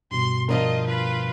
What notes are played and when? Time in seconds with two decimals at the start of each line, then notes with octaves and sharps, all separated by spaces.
0.11 G2 B2 C6
0.49 F3 D4 F4 A#4 D#5
0.87 F4 B4